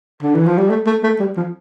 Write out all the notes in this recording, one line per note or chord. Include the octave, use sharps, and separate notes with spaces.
D3
E3
F3
G3
A3
A3
A3
G3
F3